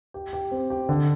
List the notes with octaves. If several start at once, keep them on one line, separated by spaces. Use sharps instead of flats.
G4
G4
C4
G4
D3